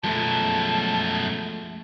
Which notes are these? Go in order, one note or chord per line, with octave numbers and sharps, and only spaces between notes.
F#2 B2 F3 G#3 A3 A5